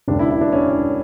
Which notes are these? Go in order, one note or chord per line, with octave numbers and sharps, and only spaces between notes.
E1 D#2 C#3 D4
E4
E4
D4
C#4